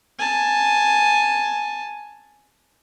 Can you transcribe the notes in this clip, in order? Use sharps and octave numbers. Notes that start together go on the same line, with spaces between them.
G#5 A5